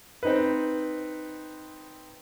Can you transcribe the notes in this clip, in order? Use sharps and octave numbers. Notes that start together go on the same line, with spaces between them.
C4 D#4 B4